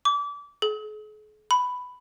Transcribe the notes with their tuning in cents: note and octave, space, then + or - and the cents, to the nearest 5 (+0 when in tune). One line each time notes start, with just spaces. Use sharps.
D6 -30
G#4 +45
B5 +10